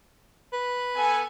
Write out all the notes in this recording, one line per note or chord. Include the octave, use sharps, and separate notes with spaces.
B4
B3 A4 G#5